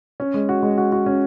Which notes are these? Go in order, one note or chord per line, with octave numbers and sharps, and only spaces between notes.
C#4
G#3
F#4
G#3
F#4
F#4
C#4